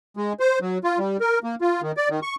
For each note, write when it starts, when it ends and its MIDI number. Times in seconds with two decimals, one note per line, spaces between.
0.17 0.33 56
0.40 0.59 72
0.62 0.78 54
0.84 0.98 65
0.99 1.17 55
1.21 1.39 70
1.44 1.55 58
1.61 1.81 65
1.82 1.92 51
1.97 2.09 74
2.10 2.20 51
2.22 2.35 85